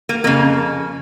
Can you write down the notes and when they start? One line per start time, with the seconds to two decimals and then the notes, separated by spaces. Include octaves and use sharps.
0.09 A#3
0.24 F2 C#3 A#3